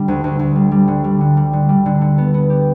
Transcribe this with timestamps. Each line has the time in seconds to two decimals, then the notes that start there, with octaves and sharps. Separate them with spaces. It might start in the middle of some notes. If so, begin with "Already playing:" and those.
Already playing: D3 G3
0.08 D2
0.24 D2
0.39 D2
0.55 G3
0.71 G3
0.88 D3
1.04 G3
1.21 D3
1.37 G3
1.53 D3
1.69 G3
1.86 D3
2.01 D3
2.18 B3
2.34 B3
2.50 G4